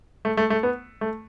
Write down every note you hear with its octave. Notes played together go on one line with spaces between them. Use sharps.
A3
A3
A3
B3
A3